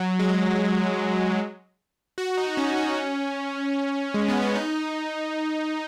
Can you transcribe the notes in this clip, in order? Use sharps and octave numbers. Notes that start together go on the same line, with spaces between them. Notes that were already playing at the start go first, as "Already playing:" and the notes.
Already playing: F#3
G#3
F#4
D#4
C#4
C#4
G#3
B3
C#4
D#4